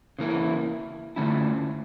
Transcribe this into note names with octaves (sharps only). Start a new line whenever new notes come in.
C#3 E3 A#3 E4
D3 A3 C#4 E4